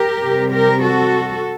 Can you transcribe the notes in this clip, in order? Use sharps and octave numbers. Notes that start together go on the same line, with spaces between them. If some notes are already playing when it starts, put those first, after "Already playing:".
Already playing: G4 A#4
C3 G3 C4
G4 A#4
F#4 A4